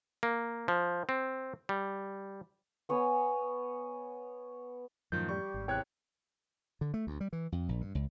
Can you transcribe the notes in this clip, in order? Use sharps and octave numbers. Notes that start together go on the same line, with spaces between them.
A#3
F3
C4
G3
B3 C#5 F#5 G#5
F#2 A2 D#3 F3 G6
G3 C#6
G#1
E2 C3 C#5 G5 F#6 G#6
D3
A3
D2
G3
E3
F2
A#1
G2
C#2